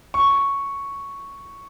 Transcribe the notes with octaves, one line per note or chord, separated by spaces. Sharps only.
C#6